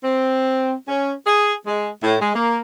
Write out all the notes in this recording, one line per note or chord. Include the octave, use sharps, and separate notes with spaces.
C4
C#4
G#4
G#3
A2
G#3
A#3